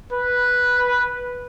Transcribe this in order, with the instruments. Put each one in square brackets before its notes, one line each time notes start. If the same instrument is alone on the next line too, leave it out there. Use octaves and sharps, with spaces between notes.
[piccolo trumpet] B4